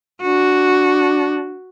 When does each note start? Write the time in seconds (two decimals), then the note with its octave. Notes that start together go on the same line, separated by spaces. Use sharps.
0.22 D4 F#4